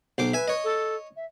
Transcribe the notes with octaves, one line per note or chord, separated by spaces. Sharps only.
B1 C5 D6
B4 E5 G#5
C#5 D#5
A4
E5